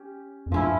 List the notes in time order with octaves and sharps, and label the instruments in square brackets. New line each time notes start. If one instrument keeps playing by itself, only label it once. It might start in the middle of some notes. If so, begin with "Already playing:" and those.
Already playing: [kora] C#4 G4
[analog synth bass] F2
[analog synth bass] G2 [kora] F3 C#4 E4